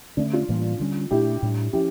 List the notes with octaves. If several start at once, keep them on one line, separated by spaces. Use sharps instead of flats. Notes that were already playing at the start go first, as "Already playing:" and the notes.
D3 A3 C#4 D4
D4 F4
A2 E3 G3 A#3
D3 G3 C#4
A#2 A3 D4 E4 G4
A2 G3 D4
F3 C#4 E4 G4